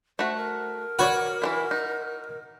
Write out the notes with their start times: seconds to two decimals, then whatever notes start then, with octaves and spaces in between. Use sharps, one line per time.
0.19 A3 F#4 C5
0.37 A#4
0.99 F#4 B4 C#5 D5
1.42 E3 G#3 E4
1.71 D#4